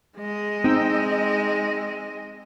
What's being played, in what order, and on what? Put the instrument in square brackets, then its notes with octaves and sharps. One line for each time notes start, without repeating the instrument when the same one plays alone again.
[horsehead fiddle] G#3 D#5
[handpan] C4 [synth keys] D#4 G5 E6